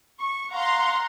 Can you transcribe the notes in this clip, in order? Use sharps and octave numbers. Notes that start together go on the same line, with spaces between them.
C#6
F5 F#5 A#5 C6